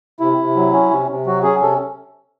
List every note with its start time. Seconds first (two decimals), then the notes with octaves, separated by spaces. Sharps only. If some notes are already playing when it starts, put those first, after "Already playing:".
0.20 C3 E4
0.38 C3
0.56 F#3
0.73 C#4
0.91 C3
1.09 C3
1.26 F#3 F#4
1.43 C#4 G#4
1.61 C3 A4